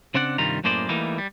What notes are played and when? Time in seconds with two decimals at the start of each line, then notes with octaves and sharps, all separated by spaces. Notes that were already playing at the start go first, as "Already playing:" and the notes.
0.14 C#3 C4 D4 D5 F#5
0.38 C2 G2 D#3 G3 F4 A#5
0.64 F#2 A2 A#3 G#4 C5 D5
0.89 E3 G3 A3 A#3 D#4
1.18 G3